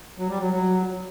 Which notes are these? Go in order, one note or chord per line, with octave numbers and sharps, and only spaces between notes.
F#3
G3
F#3
F#3